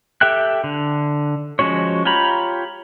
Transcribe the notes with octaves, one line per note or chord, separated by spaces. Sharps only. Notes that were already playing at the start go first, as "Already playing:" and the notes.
G4 A4 E5 G5 F#6
D3
F3 G#3 C#4 F#4 C#5
F4 G4 C#5 A#5 B5